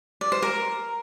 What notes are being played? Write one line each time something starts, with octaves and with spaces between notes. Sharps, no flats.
D5
C5
A#4